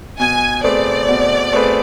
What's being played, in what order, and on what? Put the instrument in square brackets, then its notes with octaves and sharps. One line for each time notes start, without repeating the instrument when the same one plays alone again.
[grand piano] B2 [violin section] G#5
[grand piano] A3 C4 G#4 B4 [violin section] D5
[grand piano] B2
A3 C4 G#4 B4